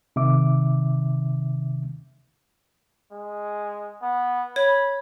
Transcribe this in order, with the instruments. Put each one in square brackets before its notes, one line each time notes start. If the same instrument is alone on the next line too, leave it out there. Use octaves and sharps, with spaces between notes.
[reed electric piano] C3 D#3 E5 D6
[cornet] G#3
B3
[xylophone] C#5 [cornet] B5